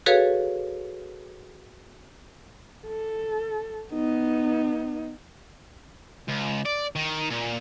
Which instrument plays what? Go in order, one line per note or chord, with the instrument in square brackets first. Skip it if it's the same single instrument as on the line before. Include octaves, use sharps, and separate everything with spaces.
[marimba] F#4 G#4 A4 B4 C#5 F5
[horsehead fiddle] A4
B3 D#4
[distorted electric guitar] C#2
D5
D#3
A#2